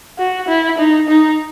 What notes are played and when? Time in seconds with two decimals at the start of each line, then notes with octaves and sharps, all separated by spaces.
0.19 F#4
0.48 E4
0.78 D#4
1.08 D#4